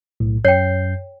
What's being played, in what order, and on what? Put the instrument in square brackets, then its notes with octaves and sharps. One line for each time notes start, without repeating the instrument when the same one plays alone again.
[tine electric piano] B1 A2
[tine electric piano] F#2 G6 C7 [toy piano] C#5 G5